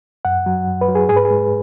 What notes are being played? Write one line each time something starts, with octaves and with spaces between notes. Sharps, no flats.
F#2 F#5
F#3
F#2
B4
F#3
G#4
G#2 G#4
B4
G#4
G#3